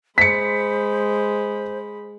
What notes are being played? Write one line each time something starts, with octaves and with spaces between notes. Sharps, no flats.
G#3 C5 B5 B6 C#7